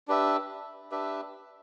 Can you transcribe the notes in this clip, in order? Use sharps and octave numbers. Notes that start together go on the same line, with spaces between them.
D4 G4 B4 E5
D4 G4 B4 E5